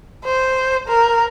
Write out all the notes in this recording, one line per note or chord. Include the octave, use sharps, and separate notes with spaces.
C5
A#4